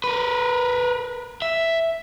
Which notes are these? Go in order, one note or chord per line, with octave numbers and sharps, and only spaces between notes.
A#4 B4
E5